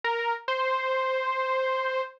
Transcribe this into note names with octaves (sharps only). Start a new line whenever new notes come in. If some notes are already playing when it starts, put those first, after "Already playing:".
A#4
C5